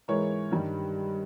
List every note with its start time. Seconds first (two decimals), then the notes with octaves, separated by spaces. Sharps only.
0.08 G#2 E3 G#3 A#4 C#5
0.51 G2 D#3 G3